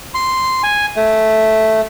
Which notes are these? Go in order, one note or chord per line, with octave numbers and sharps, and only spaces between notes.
C6
G#5
A3